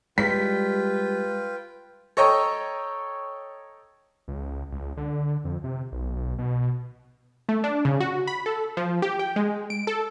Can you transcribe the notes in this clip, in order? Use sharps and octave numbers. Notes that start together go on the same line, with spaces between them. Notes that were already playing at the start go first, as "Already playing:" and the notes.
G3 G#3 F4 B4 G5 B6
A4 C#5 D#5 G5 A#5 C#6
C#2
C#2
D3
F2
C3
B1
B1
B2
A3
D4
C#3
F#4
B5
A4
F3
G4
G5
G#3
D7
A4